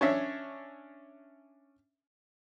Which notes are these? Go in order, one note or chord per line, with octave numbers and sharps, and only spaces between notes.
C#4 D4 C#5 E5